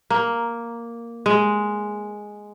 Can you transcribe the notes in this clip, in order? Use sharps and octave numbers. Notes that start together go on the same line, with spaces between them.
A#3
G#3